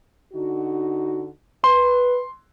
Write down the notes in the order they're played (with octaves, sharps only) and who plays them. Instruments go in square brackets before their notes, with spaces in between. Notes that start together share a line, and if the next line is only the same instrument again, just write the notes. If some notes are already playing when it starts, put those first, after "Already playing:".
[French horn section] D3 D#4 F#4
[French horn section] B4 [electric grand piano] C6